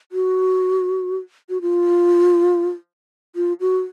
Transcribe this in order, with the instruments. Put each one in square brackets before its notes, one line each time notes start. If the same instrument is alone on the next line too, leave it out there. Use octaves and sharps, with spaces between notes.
[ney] F#4
F#4
F4
F4
F#4